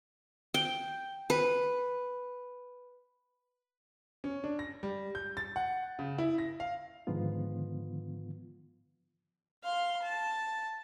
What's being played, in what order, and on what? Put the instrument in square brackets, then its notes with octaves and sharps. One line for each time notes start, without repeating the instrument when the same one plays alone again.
[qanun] G5
B4
[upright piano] C#4
D4
A#6
G3
G6
A6
F#5
C#3
E4
A#6
F5
[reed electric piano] G#2 D3 D#3 F3 B3 F4
[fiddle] F5 C6
A5